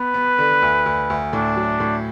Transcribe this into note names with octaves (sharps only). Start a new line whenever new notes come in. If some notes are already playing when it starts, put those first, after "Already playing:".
Already playing: B3 B4
B3
D3
D2
D2
D2
A2 D4
F#3
A2